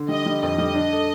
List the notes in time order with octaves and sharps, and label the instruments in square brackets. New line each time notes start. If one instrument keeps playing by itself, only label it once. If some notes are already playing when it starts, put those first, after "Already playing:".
Already playing: [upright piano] D3
[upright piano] G3 [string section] D#5
[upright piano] G3
[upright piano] F2 [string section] D#5
[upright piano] G3
D4
A4